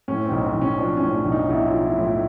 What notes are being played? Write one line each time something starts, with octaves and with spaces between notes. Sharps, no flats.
A2 C#4
C4
B1
C4
B1
C#4
F3 D4
C#4
A2
D4
B1
D#4
B1 E4
F4
F3
E4
A2
F4